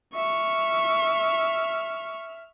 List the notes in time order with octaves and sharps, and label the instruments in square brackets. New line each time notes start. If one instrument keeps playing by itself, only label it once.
[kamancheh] E5 F6 [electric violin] C#6